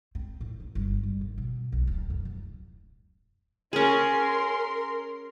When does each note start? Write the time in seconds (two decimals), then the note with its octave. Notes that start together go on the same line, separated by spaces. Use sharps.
0.15 C4
0.41 A2
0.60 D#3
0.75 G1
1.03 G3
1.21 G#2
1.38 B2
1.72 B1
1.87 D1
2.10 F#2
2.25 D1
3.73 C#4 G#4 A#4 C6